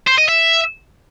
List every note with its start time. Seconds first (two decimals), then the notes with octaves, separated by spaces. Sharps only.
0.07 C5
0.18 D#5
0.29 E5